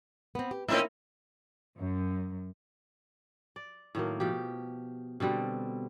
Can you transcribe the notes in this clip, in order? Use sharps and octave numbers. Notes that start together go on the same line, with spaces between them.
B3 C4
G4
A2 A#3 C4 C#4 D#4 E4
F#2
D5
A2 D#3 F#3 A#3
B2 F3 G4
B2 D3 G3 C4